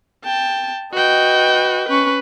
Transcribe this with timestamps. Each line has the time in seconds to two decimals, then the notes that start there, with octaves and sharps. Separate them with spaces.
0.25 G5 A5
0.93 F#4 B4 D#5 G5
1.89 C#4 B4 C#6